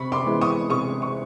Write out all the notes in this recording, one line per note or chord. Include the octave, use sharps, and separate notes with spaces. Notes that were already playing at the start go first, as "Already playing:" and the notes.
Already playing: C3 B5 C#6
C6 D6
E3 G#3 B3
C#6 D#6
C3 C#6 D#6
C#6